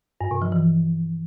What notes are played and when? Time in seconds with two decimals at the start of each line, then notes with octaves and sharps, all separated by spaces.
0.21 G2
0.31 C3
0.42 F3
0.52 E3